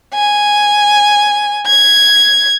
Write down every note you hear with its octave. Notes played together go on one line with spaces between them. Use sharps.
G#5
G#6